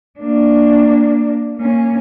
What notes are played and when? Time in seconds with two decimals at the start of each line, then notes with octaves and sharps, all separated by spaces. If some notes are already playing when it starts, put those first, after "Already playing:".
0.19 A#3 D4
1.58 A#3 C#4